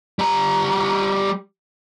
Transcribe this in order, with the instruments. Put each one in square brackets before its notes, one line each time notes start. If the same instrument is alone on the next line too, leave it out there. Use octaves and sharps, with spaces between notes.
[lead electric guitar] G3 A#5